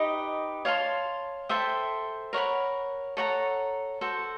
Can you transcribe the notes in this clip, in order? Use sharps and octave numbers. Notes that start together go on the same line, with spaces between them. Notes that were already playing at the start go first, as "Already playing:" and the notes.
Already playing: D#4 G4 B4 D#5
C#5 F5 A5 C6
A4 C5 E5 G5
A#4 C#5 F#5 B5
A4 C#5 F#5 A#5
F#4 A4 C5